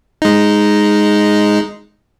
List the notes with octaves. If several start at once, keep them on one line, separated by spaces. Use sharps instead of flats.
G#3 D#4